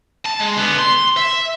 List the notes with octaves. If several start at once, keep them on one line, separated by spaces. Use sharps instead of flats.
A5
G#3
D3 B3
C6
E5